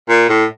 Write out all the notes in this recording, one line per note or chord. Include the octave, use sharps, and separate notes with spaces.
A#2
A2